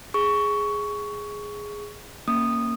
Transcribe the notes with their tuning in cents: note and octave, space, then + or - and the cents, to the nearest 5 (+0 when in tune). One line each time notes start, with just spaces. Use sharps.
G#4 +0 C#6 +15
A#3 +0 C#4 +0 D#6 -10